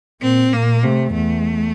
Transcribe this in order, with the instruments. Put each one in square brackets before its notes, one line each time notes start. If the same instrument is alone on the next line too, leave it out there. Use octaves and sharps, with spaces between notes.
[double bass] A#2 [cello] C4
[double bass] A#2 [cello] A#3
[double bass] C3 [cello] A3
[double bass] E2 [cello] A3